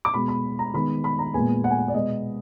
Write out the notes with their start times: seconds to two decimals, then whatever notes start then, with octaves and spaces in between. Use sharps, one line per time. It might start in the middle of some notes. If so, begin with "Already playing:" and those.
0.05 D6
0.14 B2 G#3 B3 B5
0.28 B5
0.59 A#5
0.74 D#3 G#3 B3 B5
1.04 B5
1.19 A#5
1.34 A#2 G#3 B3 G#5
1.64 F#5
1.71 G#5
1.78 F#5
1.88 D5
1.94 B2 G#3 B3 D#5